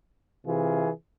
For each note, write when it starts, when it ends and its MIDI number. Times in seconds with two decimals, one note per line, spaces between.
0.46 0.89 48
0.46 0.89 52
0.46 0.89 65
0.46 0.89 68